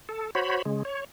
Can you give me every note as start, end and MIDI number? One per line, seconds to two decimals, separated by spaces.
0.09 0.30 69
0.35 0.62 66
0.35 0.62 72
0.35 0.62 73
0.35 0.62 83
0.65 0.83 49
0.65 0.83 56
0.85 1.04 73